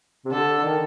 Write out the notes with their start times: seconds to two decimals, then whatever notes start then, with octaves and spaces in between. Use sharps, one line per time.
0.25 C3
0.32 D3 A4
0.64 D#3